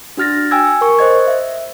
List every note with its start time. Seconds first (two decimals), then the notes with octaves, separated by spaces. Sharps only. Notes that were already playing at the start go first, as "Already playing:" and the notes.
0.17 D4 F#4 F6 A6 A#6
0.51 G5 G#5 E6 G#6
0.81 A#4 C#6
0.99 C5 D#5 G#6
1.27 E5